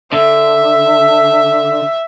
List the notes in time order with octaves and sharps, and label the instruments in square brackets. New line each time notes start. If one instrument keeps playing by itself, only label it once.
[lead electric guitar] D3 [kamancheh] E5